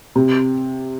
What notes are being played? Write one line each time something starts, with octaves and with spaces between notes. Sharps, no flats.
C3